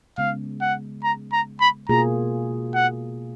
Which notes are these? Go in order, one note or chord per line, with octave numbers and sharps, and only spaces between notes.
C#3 G#3 B3 F5
F#5
A#5
A#5
B5
B2 A#3 F4 G#4 A#5
F#5